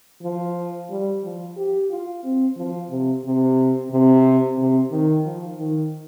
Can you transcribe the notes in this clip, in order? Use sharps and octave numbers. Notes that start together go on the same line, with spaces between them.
F3
G3
F3
G4
F4
C4
F3
C3
C3
C3
C3
D#3
F3
D#3